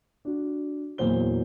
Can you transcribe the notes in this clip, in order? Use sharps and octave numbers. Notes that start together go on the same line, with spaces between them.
D4 F#4
E2 A#2 E3 F#3 C5 G7